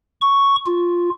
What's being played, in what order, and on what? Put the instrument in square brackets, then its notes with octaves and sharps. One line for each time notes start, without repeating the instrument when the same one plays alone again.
[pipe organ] C#6
F4